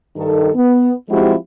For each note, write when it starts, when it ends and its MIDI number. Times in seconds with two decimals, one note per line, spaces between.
0.17 0.50 43
0.17 0.50 51
0.17 0.50 69
0.55 0.93 59
1.10 1.34 53
1.10 1.34 56
1.10 1.34 60
1.10 1.34 64
1.10 1.34 66
1.10 1.34 67